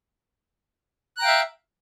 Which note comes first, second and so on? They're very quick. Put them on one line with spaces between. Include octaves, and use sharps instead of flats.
F#6 A#5 G5 F5 E5